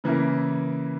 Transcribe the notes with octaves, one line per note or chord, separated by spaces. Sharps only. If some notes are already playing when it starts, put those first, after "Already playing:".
C#3 E3 A#3 E4 A#4